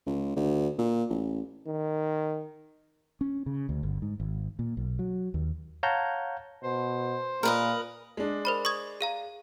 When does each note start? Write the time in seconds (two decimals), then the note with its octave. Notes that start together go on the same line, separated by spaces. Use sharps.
0.06 C#2
0.36 D2
0.78 A#2
1.10 A1
1.67 D#3
3.21 C#4
3.46 C#3
3.69 D2
3.83 G1
4.02 G#2
4.20 G#1
4.59 A#2
4.77 B1
4.99 F#3
5.34 D#2
5.83 C#5 F5 F#5 A5 A#5 G6
6.63 B2 C5
7.43 A#2 A#4 B4 D#5
8.17 G#3 D4
8.45 A#4 C5 B5
8.65 C#6 D#6 G#6
9.01 G#4 F5 A#5